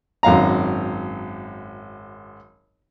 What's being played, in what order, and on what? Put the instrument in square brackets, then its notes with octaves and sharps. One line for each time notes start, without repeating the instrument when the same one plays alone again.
[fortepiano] G#1 F#2 F5 A#5